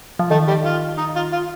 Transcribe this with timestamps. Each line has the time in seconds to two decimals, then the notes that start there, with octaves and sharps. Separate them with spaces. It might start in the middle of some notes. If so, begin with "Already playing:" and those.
0.19 F3
0.31 D#3 A3 A4
0.48 G3 G4
0.65 F4
0.98 D#4
1.16 F4
1.32 F4